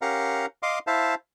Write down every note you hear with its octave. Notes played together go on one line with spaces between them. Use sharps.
C#4 G4 A#4 F5 F#5 A#5
D#5 F5 C6 D6
E4 C5 E5 F5 A5